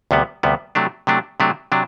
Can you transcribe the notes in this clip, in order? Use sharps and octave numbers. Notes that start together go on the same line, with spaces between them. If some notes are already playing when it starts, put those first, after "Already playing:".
D2 C3 G3 B3
D2 C3 G3 B3
C3 F#3 A3 D4
C3 F#3 A3 D4
C3 F#3 A3 D4
C3 F#3 D4